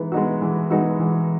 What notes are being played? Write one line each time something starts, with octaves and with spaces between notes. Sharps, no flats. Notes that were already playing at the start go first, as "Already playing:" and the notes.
Already playing: E3 G#3 B3 D#4
G#3 B3 D#4 F#4
E3
G#3 B3 D#4 F#4
E3